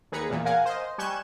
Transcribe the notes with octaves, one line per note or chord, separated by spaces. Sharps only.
D#2 G#4 B4 A#5 C#7
E2 A#2 E3
A#4 F5 F#5 G#5
C5 D#5
G3 G#5 C#6 F#6 G6 E7